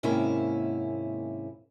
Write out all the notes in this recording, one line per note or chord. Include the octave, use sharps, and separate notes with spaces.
D#2 G#2 C3 A#3 C#4 E4